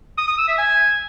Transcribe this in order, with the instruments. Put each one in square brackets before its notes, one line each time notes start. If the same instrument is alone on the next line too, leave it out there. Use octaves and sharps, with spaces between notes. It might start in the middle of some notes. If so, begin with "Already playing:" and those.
[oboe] D#6
D#6
E6
E5
G#5